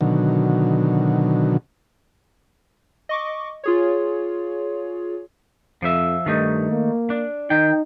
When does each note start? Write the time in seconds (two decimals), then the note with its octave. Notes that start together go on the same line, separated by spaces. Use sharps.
0.01 B2 D3 D#3 F#3
3.09 D#5 C#6 D6
3.64 F4 G#4 C#5
5.82 F2 F3 E5
6.26 G2 D#3 A3 D#4
6.71 A#3
7.10 D4
7.50 D#3 D#4 G5